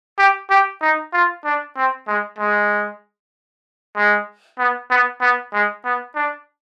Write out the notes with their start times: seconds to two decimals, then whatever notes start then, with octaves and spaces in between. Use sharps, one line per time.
0.19 G4
0.50 G4
0.82 D#4
1.13 F4
1.45 D4
1.77 C4
2.08 G#3
2.38 G#3
3.96 G#3
4.59 B3
4.91 B3
5.21 B3
5.53 G#3
5.85 B3
6.16 D4